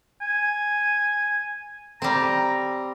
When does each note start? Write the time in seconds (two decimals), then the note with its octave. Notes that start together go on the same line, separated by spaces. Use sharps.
0.21 G#5
2.02 G3 C4 A#5